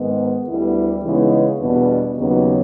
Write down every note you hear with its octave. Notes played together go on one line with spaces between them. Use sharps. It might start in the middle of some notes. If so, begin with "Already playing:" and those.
Already playing: G#2 D#3 G#3 B3
D2 D3 G3 B3 E4
C#3 E3 G#3 B3 D#4
E2 B2 G3 B3 D4
D#2 C#3 F#3 B3 D#4